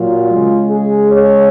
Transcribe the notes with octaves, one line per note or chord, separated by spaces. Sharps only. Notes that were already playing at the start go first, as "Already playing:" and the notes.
Already playing: A#2 F#3 F4
C#3 G#3
G#4
C#5